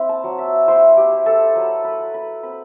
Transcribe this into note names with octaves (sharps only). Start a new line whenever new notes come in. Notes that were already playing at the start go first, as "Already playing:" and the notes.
Already playing: C4 E4 B5
A5
F#3
E5
E4 C5
G4
E4
A4
F#3 B4
B4
F#3
B4
C4 B4